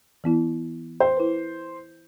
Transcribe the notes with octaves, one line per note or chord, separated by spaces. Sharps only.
E3 B3 E4
C5 G5
E4 B4